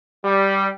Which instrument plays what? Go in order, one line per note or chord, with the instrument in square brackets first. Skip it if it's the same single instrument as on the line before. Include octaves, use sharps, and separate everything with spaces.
[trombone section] G3